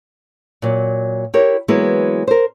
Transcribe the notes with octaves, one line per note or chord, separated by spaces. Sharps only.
A#2 F#3
E4 G4 A#4 C#5
E3 F#3 G#3 A#3 B3 E4
A#4 C5